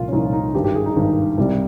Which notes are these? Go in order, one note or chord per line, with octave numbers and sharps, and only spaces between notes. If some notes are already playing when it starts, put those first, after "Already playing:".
Already playing: C2 A#2 F3 F4
C#4
C2 A#2 F3 D#4
D#4
G#1 G2 D#3 G4
G4
G#4
D#4
G#1 G2 D#3
C2 C3 G3